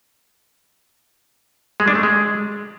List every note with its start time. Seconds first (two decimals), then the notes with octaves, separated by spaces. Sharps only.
1.80 G#3
1.88 D4
1.95 A3
2.03 G#3